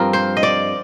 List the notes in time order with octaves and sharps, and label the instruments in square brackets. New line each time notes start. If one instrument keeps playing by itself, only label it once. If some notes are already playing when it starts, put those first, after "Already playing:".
Already playing: [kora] G2 F3 C4 F4 A#4
C5
D#5
D5